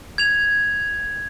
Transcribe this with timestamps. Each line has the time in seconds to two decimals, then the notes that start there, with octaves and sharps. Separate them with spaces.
0.18 G#6 F7